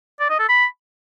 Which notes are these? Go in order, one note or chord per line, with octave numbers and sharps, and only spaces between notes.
D5
D#5
A4
B5